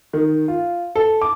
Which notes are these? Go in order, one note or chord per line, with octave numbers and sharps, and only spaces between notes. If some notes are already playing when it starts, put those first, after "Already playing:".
D#3
F4
A4
D6